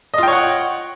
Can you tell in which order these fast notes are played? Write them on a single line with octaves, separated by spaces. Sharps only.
D#5 F4 G5 C#5 F#5